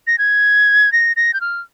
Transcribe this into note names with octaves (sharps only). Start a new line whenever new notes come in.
A#6
G#6
A#6
A#6
G6
F6